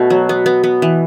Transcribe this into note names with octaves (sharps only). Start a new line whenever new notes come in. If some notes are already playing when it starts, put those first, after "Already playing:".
Already playing: B2 A3
F#3
B3
B3
B3
E3